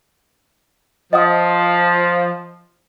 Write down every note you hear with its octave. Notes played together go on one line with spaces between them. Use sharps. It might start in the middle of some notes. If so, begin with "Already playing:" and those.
F3 D#5 F#5 D#6